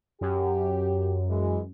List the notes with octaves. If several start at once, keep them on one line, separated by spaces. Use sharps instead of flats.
F#2 G4
E3 G#3